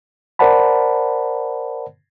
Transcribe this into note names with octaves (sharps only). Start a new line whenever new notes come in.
A#4 C5 D5 F#5 A5 B5